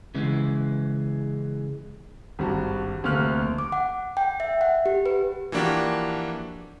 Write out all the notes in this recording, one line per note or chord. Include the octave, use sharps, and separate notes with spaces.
C#3 E3 G#3
G#1 G2 F#4
F1 D2 A#3 F6 F#6
D6
F#5
G5
E5
F#5
G4
B4
E3 F3 A#3 D4 F#4 G4